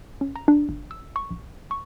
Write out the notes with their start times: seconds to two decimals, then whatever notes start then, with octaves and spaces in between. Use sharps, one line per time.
0.21 C#4
0.36 A#5
0.48 D4
0.69 G1
0.91 E6
1.16 C#6
1.31 A#1
1.71 C#6